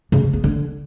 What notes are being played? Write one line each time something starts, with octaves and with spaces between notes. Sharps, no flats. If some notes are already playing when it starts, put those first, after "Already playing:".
C#3
C#3
B3
D3